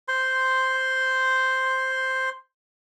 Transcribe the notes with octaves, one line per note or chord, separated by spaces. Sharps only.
C5 C6